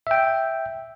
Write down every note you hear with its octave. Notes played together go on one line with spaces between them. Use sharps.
E5 G5